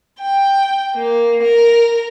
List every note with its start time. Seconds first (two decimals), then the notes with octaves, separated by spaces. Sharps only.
0.19 G5
0.96 A#3
1.43 A#4